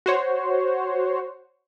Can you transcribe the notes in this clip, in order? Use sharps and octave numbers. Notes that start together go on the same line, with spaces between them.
F#4 C5 C#5